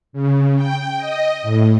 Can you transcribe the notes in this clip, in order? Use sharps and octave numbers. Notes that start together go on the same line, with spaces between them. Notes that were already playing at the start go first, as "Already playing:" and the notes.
C#3
G5
D#5
A2